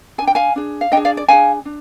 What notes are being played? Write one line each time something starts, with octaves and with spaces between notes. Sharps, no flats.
D4 G#4 G#5
G5
F5 G#5
D4 G#4
F5
D4 D#5 G5
G#4
D5 F5
D5
D4 G#4 F5 G#5
D4